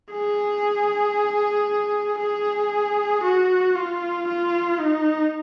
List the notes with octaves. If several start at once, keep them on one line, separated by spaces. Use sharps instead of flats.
G#4
G#4
F#4
F4
F4
D#4